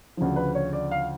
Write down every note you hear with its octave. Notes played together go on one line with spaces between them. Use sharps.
D2 C#3 F3
B4
C#5
D5
F5